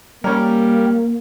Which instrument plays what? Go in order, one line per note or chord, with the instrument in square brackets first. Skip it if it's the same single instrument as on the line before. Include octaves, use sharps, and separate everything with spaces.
[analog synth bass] G3 [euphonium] A#3 [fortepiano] C#4 A#4